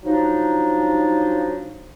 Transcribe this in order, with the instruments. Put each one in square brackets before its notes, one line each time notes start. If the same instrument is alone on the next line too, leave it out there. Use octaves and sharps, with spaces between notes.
[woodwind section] F3 F#3 D4 D#4